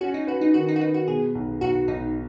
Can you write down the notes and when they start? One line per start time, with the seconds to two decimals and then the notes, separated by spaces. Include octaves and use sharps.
0.01 C#4 F#4
0.14 D#4
0.27 F#4 B4
0.41 D#4
0.54 D#3 F#4
0.68 D#4
0.76 F#4
0.81 D#4 B4
0.94 F#4
1.08 B2 G#4
1.35 B1
1.61 B1 F#4
1.88 B1 D#4